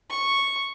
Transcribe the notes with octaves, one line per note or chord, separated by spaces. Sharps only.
C#6